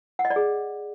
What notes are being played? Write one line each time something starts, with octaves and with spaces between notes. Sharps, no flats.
F#5
D#5
D5
G#4